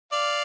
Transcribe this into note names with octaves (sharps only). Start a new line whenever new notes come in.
D5 F5